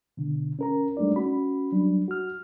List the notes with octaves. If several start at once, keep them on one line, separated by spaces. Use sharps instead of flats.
B2 D3
C#4 A#4 A#5
G3 A3 D4 D#4 D5
C#4 F#4 B5
F#3 G3 D4
F#4 F6